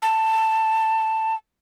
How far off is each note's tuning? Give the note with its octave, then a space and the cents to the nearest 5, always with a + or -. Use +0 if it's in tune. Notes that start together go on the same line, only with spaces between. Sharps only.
A5 +10